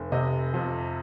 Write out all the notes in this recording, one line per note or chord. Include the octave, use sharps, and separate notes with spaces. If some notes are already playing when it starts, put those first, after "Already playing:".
Already playing: F1
C3 D#5
F2